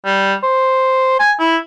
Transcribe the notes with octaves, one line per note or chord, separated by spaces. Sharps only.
G3
C5
G#5
E4